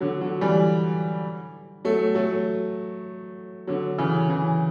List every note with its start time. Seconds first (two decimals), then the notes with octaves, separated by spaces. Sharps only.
0.01 D3 F#3
0.21 D3 F#3
0.41 E3 G3
1.85 F#3 A3
2.15 F#3 A3
3.67 D3 F#3
3.98 C#3 E3
4.29 C#3 E3